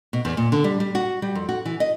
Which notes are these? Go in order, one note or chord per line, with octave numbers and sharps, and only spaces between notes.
B2
E2
A#2
D3
G3
G3
F#4
G3
F2
F#4
E3
D#5